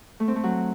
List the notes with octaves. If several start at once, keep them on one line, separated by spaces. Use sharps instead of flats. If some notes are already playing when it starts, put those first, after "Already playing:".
A3
C4
A3
F#3